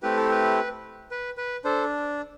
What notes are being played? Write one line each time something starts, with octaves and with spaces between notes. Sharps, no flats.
A3 C4 E4 G4 B4
A4
B4
B4
B4
D4 A4 C5